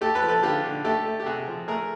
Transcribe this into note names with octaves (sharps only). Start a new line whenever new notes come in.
A3 G4 A4
A4 B4
F3
A4 B4
D3 F4 G4
D3
A3 G4 A4
A3
G4
C3 F#4 G#4
F3
A3 G#4 A#4